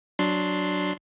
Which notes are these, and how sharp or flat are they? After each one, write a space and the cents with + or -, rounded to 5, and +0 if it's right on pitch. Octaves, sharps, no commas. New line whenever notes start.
F#3 +0 D4 +0 C6 +0